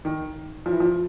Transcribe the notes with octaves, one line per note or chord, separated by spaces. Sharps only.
D#3
F3
E3
F3